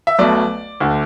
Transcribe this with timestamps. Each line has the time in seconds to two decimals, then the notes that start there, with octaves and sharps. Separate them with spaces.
0.07 E5
0.19 B1 B2 A3 D5
0.80 D2 D3 A3